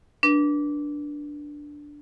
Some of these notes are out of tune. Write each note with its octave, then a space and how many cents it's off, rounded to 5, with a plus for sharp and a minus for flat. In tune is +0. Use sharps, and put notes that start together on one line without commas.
D4 +0 B4 -35